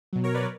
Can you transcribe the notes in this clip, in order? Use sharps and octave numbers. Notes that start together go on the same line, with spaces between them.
B2 F#3
A#4 C#5
B4 D5